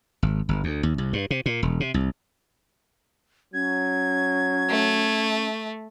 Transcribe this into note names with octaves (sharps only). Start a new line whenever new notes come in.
G#1
G1
D2
D#2
C2
G2
C3
A#2
E1
C3
C2
F#3 C#4 G#6
A3